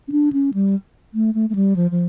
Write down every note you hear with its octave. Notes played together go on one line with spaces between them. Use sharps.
C#4
D4
C#4
G3
A3
A3
A3
G3
F3
F3